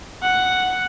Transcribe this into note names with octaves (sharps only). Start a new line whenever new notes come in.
F#5